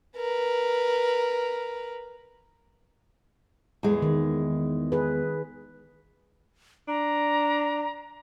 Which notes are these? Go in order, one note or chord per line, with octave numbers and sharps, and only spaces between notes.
A#4 B4
E2 G#3
D#3
G#4 B4
D4 A#5